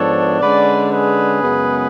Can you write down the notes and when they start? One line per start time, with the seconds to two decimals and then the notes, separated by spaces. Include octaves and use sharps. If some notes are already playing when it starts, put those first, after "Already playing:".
Already playing: G#2 F3 B3 D4 A4 C#5
0.41 D3 G#3 C#4 B4 D5
0.92 G#4 B4
1.43 F#2 C#3 G#3 B3